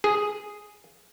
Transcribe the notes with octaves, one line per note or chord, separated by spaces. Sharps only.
G#4